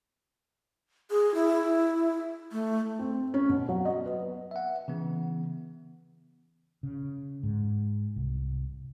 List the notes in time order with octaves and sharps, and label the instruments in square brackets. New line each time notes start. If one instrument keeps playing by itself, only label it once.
[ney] G#4
E4
A3
[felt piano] C4
C#4
B2
F#3
D#5
B3
[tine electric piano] E5 F#5
C#3 E3 B3
[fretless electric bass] C#3
G#2
C2